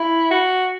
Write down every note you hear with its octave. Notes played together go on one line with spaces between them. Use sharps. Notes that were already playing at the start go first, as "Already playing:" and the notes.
Already playing: E4
F#4